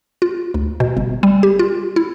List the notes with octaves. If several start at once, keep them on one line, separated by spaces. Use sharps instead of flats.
F4
D2
B2
G1
G3
G4
F4
E4